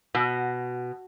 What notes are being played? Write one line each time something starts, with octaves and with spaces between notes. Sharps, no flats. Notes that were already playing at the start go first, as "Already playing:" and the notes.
B2